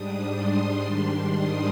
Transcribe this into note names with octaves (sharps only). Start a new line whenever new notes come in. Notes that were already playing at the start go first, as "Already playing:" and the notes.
Already playing: G#2 G3 D4 D#6
C6
G#2 D#3 G3 D4
D#6